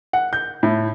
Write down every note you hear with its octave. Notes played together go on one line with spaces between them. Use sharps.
F#5
G6
A2